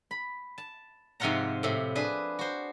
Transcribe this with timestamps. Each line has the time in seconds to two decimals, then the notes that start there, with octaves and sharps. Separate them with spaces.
0.11 B5
0.58 A5
1.20 G#2 C3 F3 F4 F#5 A#5
1.63 A2 C3
1.95 D4 G#4 B4
2.39 F#4 C5